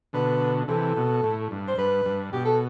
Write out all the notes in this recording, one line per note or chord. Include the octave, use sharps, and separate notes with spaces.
B2 D3 B4
C3 E3 A4
B2
A2
G2
C5
G2 B4
G2
B2 G4
A4